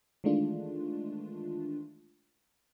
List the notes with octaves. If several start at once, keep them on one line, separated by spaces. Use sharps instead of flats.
D#3 E3 G#3 A3 D4 F4